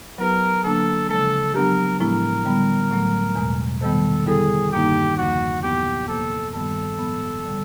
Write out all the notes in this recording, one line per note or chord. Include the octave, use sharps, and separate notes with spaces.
F#3 B3 E4 G4 A#4 B4
D3 F#3 A#3 D4 A4
C#3 F3 G#3 A4
F#3 B3 D4 G4 A#4
A2 F3 G#3 B3 E4 A#4
D3 G3 B3
A2 F#3 A3
E2 B2 G#3
C3 D#3 G3 B3 A4
D3 G3 B3 E4 G#4 A4
G2 D#3 G3 A#3 D#4 G4
E2 C#3 F3 A#3 F#4
A#2 F#3 B3 E4 G4
C3 F3 A#3 A4
G2 D#3 G3 B3 A4
A2 F3 G#3 B3
D3 G3